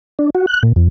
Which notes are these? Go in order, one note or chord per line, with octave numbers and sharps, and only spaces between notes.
D4
F#4
F#6
A#2
F2